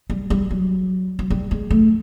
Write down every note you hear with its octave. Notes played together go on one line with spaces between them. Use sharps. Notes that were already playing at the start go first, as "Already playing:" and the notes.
G3
G3
F#3
F#3
G3
G#3
A3